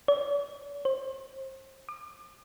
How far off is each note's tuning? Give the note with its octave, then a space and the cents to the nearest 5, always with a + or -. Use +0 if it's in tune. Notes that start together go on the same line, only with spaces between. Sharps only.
D5 -45
C5 +30
D6 +40